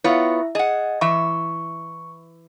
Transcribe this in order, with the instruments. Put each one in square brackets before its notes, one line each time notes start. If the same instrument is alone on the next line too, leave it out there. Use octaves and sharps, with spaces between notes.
[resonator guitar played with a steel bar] B3 F4 C#5 [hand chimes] E4 E5
[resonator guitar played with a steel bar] G#4 F#5 [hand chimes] D#5
[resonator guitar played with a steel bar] E3 E5 [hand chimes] C#6